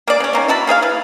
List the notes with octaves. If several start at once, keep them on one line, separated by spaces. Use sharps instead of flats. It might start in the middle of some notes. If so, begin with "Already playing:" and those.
A#3 G#4 D5
C#3 C#4
D#3 A#3 C#4
E4 F#4 A5 B5
A#3 G#4 C#5 F5
E4 B4